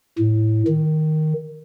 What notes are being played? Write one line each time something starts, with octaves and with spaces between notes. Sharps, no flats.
A2
D#3